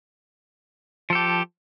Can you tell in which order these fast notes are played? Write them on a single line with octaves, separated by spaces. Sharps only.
F3 A4 G4